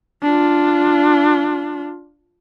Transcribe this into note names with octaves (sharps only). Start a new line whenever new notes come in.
D4 F4